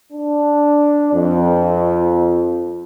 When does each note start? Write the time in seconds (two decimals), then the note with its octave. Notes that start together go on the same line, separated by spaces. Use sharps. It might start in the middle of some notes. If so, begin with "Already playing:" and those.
0.13 D4
1.13 F2